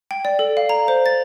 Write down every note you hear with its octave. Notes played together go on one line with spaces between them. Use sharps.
G5
D5
A4
F5
A#5
C5
A6